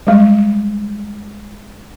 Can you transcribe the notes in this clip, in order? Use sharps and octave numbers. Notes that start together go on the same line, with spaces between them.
G3 G#3